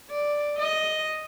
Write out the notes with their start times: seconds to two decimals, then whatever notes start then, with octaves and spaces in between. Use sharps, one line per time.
0.11 D5
0.59 D#5